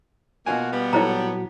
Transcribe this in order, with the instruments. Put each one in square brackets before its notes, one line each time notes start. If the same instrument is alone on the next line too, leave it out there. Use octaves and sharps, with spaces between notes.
[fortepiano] B2 F4 G#5 [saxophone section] A#3 F#4
[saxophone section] G3 B3
[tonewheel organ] A#2 F#3 F#4 [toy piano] E4 C5 A#5 [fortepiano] A4 C#5